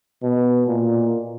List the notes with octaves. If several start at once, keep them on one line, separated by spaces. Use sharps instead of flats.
B2
A#2